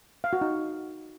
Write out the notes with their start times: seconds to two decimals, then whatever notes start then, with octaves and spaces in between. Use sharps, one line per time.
0.24 F5
0.33 F#4
0.41 D#4